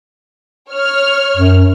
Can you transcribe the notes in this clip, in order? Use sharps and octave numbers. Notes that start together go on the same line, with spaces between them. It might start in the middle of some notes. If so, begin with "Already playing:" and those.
C#5 F6
F#2